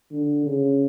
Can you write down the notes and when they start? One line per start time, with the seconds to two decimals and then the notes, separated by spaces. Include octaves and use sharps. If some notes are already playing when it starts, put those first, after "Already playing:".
0.11 D3
0.46 C#3